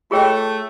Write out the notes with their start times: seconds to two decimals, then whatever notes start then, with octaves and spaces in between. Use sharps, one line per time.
0.11 A3 F4 G#4 C#5 E5 G5